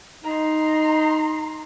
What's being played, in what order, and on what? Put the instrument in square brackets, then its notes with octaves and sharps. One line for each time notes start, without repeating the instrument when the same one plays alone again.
[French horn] D#4 [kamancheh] A#5 C6